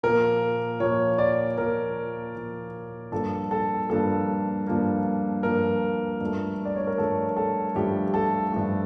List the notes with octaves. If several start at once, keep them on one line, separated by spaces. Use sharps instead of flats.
A#2 F3 A#3 A#4
A#2 F3 A#3 C#5
D5
A#2 F3 A#3 A#4
A#2 F3 A#3
G2 F3 A#3 A4
A4
G2 F3 A#3 A4
G2 F3 A#3
G2 F3 A#3 A#4
G2 F3 A3
D5
C#5
A#4
G2 F3 A3 A4
A4
G2 F3 A3 G4
A4
G2 F3 A3